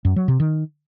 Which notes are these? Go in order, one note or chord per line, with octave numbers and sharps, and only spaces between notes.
F#2
F#3
C3
D#3